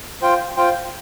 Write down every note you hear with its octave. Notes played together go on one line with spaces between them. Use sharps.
F4 C5 G5
F4 C5 G5